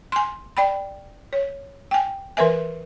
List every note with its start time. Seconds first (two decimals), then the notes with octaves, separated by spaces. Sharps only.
0.12 G#5 C6
0.57 D5 G5 B5
1.33 C#5
1.91 G5 G#5
2.37 E3 A#4 B4 E5 G#5